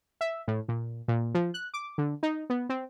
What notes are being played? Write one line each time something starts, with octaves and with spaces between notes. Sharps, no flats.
E5
A2
A#2
A#2
F3
F#6
D6
D3
D#4
B3
C4